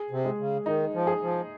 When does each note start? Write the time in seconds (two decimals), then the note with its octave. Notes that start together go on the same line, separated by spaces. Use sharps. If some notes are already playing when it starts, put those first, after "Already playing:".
Already playing: G#4
0.11 C3
0.25 G#3
0.38 C#3
0.66 D#3 D#4
0.94 F3
1.07 G#4
1.22 F3